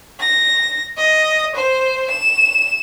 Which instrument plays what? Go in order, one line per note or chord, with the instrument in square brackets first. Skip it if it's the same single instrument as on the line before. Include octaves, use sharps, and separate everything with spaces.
[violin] A#6
D#5
C5
E7